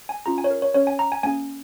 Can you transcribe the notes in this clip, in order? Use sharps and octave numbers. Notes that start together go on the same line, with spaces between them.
G#5
C#4 F4 G#4 A#5
G#5
C#5
A#4
C#5
C#4 G#4 C#5
G#5
A#5
G#5
A#3 C#4 G#4 G#5